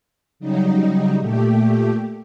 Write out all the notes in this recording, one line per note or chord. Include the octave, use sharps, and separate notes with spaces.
C#3 F#3 G3 D#4
A#2 A3 G4